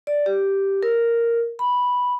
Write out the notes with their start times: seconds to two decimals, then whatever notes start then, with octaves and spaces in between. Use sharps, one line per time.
0.07 D5
0.26 G4
0.83 A#4
1.59 B5